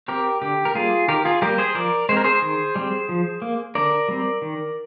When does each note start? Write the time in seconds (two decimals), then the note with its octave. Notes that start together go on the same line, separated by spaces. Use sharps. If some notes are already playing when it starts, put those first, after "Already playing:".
0.08 C4 G4 A#4
0.42 D3 G4
0.65 A#4
0.74 G3 A#3 F4 G#4
1.08 D#3 G4 A#4
1.25 F4 G#4
1.42 G3 A#3 G4 A#4
1.58 G#4 C5
1.75 F3 A#4 D5
2.09 G#3 C5
2.12 C4 A#4
2.24 G#4 C5
2.42 D#3
2.76 G3 C4
3.09 F3
3.42 A#3
3.75 D3 A#4 D5
4.08 G3 C4
4.42 D#3